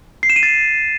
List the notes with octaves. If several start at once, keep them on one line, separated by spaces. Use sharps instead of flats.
C7
E7
D#7
A6